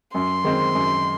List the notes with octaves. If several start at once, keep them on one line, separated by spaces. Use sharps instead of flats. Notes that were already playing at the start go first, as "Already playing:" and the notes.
F#2 C6
D#3 G#3 C4
F#2